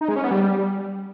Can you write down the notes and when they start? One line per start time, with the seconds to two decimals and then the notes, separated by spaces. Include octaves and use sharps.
0.01 D#4
0.08 G#3
0.16 C#4
0.24 B3
0.31 G3